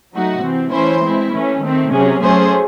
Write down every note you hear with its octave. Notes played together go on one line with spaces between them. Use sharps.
F#3 A3 D#4 F#4
C3 E3 C4
E3 A3 C#4 E4 C5
G#3 C4 E4
E3 A3 C#4
D#3 A3 C4
C3 F#3 C#4 G#4
F#3 A3 C#4 G#4 C5